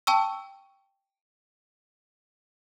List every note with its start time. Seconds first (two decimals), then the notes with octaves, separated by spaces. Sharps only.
0.07 G5 A5 C#6 E6